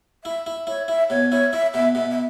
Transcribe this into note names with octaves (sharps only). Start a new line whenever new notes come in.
E4 E5
E4
E4 C#5
E4 E5
B2 C#5
E4 C#5
E4 E5
B2 E5
B2 E5
E5